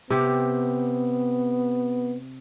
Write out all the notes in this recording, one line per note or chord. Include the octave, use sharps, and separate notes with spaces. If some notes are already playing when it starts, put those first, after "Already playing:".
C3 B3 G4